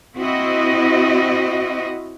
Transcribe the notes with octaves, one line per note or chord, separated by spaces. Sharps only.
C4 E4 F#4 D#5